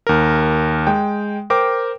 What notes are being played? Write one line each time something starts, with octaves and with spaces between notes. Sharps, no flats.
D#2 A#4
G#3 G5
A#4 C5 G5 D6